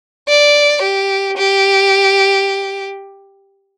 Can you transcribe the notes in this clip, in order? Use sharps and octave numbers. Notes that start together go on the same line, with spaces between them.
D5
G4
G4